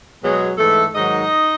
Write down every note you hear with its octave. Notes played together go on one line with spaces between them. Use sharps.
B2 F#3 G#3 G#4
G#2 E3 A3 A4
G#2 D#3 F#3 D#4 D#5